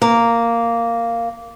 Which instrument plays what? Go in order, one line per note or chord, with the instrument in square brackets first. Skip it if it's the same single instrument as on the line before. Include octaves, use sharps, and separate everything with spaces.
[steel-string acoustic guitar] A#3